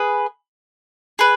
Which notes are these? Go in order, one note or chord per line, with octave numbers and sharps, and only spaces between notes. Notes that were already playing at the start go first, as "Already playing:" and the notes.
Already playing: G#4 B4
G#4 B4